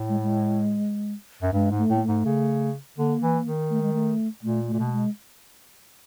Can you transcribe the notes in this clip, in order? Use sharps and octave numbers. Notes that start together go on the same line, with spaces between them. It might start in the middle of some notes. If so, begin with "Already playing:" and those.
Already playing: A2
G#3
G#3
F#2
G2 G#3
G#2
A3
A2
A#3
A3
G#2
C#3
D3 A#3
E3
D#3
A3
G#3
A3
A#2 A3
A3
A#2
B2
A3
G#3